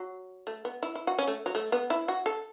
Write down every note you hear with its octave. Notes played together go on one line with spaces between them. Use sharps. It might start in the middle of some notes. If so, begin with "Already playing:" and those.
Already playing: F#3
A3
B3
E4
E4
F#4
C#4
A3
F#3
A3
B3
E4
F#4
A4